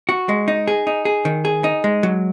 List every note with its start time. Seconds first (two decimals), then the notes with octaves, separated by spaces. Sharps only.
0.09 F#4
0.29 G#3
0.48 D#4
0.68 G#4
0.87 D#4
1.05 G#4
1.25 D#3
1.45 G#4
1.64 D#4
1.84 G#3
2.03 F#3